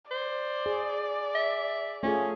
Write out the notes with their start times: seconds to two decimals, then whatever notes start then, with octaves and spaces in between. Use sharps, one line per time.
0.11 C5 D5
0.66 G#4
1.35 E5
2.03 A3 C#4 F4 G#4